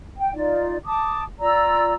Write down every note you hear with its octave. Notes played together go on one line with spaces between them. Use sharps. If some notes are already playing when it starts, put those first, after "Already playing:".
G5
D#4 F4 D5
A5 D6 D#6
F4 D5 A#5 E6